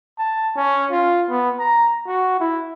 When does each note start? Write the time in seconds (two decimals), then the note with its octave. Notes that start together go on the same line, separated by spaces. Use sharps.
0.18 A5
0.56 C#4
0.91 F4
1.29 B3
1.59 A#5
2.06 F#4
2.40 E4